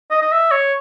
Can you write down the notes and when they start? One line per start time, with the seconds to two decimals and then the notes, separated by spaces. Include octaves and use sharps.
0.11 D#5
0.22 D#5
0.32 E5
0.51 C#5